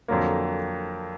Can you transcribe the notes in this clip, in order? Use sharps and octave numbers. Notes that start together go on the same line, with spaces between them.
F2 D3 F#3 A#3